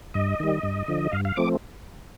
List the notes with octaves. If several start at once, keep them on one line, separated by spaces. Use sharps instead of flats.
G2 D#5
D#3 G3
G2
D3 F3
G2 F5
F5
F3 A3 C4 D6